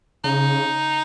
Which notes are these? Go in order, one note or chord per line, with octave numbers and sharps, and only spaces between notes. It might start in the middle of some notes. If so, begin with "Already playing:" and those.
C#3 D#4